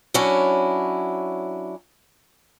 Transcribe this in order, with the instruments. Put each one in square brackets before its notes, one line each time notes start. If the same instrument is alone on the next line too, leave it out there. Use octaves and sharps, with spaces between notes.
[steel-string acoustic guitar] F#3 C#4 D4 E4